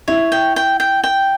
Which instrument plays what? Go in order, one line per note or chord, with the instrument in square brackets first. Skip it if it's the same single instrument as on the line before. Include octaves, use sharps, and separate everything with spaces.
[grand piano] E4 E5 [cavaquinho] C#5
[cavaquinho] G5
G5
G5
G5